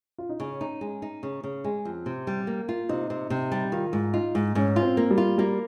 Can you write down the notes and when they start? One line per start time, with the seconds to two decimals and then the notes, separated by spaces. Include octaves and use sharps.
0.18 F4
0.29 D#4
0.40 C#3 C#4
0.61 D#4
0.81 G#3
1.02 D#4
1.23 C#3
1.44 C#3
1.64 G#3
1.85 F2
2.06 C3
2.27 G3
2.47 A#3
2.69 F4
2.89 C3 D#4
3.10 C3
3.30 C3 D#4
3.52 G3
3.72 D#3 F4
3.93 G#2
4.14 D#4 F4
4.35 G#2
4.55 G#2 C#4
4.76 F4
4.83 C4
4.97 A#3
5.11 G3
5.18 F4
5.38 G3 A#3